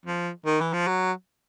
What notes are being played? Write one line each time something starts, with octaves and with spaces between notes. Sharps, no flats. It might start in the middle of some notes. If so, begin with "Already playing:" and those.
F3
D#3
E3
F3
F#3